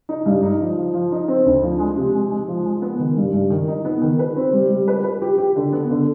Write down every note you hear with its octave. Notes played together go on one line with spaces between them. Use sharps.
D#4
G2
D#4
F3
F3
F3
D#4
C4
D2
F3
G#3
C3
G#3
G#3
F3
G#3
B3
D#3
G2
G2
D#3
D#4
B3
D#3
B4
C4
G3
G3
B4
B4
G4
G4
D3
B3
D3